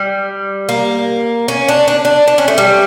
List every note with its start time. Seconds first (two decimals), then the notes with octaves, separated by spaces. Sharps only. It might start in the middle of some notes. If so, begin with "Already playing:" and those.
Already playing: G3
0.69 A#3
1.48 C#4
1.69 D4
1.88 D4
2.05 D4
2.28 D4
2.38 C#4
2.48 A3
2.58 G3